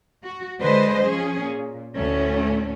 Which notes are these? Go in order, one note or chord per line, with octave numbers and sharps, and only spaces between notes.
F#4
D3 G#3 B4 C5 D#5
F3 C#4 G#4
A#2
D2 A2 A3 C#4